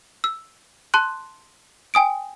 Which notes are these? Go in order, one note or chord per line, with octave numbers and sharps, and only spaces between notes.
E6
A5 C6 F#6
G5 G#5 D#6 D7